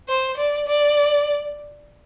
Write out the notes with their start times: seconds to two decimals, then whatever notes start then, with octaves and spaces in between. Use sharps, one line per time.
0.08 C5
0.37 D5
0.68 D5